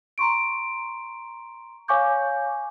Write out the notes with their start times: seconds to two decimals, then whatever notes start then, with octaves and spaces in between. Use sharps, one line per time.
0.18 A#5 C6 C#6 D7
1.88 C#5 F5 G#5 C#6 D6 G6